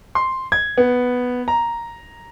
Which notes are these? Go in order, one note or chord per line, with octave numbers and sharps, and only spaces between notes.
C6
G#6
B3
A#5